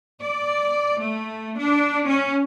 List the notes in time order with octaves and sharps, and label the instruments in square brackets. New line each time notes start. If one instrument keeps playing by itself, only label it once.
[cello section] D5
A3
D4
C#4